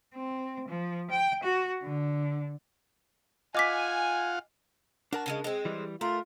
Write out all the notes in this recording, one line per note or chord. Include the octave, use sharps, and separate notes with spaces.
C4
F3
G5
F#4
D3
F4 D#5 F5 F#5 G#5 D6 B6
D4 F#4 A#4 A5
C#3 F#3 G#3
G#3 C4
E3 G3
A3 F4 A#4